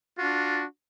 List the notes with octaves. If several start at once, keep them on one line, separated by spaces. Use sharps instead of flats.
D4 F4 F#4